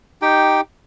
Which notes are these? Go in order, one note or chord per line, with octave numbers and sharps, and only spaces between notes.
D#4 G4 G5